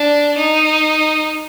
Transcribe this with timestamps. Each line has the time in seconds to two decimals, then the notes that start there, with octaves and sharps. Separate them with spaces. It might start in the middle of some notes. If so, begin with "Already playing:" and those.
Already playing: D4
0.38 D#4